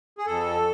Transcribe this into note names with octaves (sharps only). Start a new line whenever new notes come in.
G#4
F2 A4